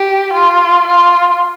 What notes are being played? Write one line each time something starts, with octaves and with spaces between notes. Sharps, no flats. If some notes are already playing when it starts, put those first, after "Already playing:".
Already playing: G4
F4
F4